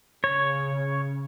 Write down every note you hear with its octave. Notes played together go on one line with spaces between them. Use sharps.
C#3 C#5